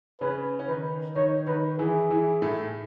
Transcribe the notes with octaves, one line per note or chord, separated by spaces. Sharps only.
C#3 C#4 B4
C#4
D#3 D#4 B4
D#3 D#4 C#5
D#3 D#4 B4
E3 E4 G#4
E3 E4
A2 A3